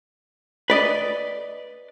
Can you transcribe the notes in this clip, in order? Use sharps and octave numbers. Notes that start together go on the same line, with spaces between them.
B4 D5 D#5